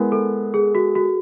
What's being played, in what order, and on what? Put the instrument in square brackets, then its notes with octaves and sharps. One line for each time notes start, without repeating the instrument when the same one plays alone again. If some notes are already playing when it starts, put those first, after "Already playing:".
Already playing: [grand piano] G#3 B3 E4 [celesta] A#4
[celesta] A4
G#4
F#4
F#4